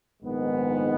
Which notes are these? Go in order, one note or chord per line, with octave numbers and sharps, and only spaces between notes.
A#1 G#2 D#3 G#3 B3